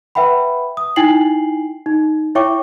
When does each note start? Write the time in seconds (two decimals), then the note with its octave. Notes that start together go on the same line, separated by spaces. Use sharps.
0.15 B4 E5 F#5 G5 B5
0.77 D#6
0.96 D#4 E4 G5 G#5 C7 F#7
1.86 D#4
2.35 E4 C#5 E5 G5 C#6 D6